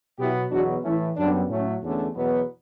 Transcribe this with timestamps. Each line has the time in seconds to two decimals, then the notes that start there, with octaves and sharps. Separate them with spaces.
0.19 B2 F#3 B3 E4 G4
0.51 E2 B2 F#3 B3 D4 F#4
0.84 A2 E3 A3 C#4 E4
1.17 F#2 D3 G3 B3 D4
1.49 A2 F#3 A3 C#4
1.82 E2 D3 A3 C#4
2.16 E2 B2 F#3 B3